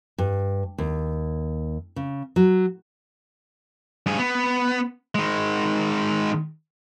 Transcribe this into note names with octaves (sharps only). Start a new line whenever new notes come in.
G2
D#2
C#3
F#3
G2 G#4
B3
D#3 G#3